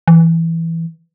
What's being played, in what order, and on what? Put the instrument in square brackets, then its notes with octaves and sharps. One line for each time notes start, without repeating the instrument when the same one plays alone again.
[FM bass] E3